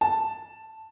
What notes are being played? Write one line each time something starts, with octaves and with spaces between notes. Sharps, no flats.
A5